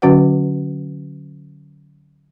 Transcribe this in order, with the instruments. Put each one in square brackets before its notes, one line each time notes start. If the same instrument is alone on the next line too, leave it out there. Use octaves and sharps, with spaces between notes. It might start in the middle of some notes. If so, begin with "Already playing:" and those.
[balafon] D3 F#3 C#4 F#4 B4 F#5